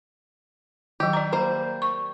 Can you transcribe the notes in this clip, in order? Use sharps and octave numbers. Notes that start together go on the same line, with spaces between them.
D#3 F#3 G4
D5 A#5
G3 A#3 C5
C#6